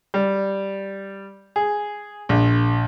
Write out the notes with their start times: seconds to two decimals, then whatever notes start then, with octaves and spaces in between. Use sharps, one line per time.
0.14 G3
1.56 G#4
2.29 A#1